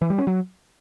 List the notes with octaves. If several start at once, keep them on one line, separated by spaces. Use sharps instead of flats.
E3
G3
C#4
F#3